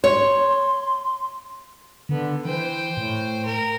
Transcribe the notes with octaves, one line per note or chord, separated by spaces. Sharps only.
C#5 C6
D3 B3
E3 C5 G5
A2
A#4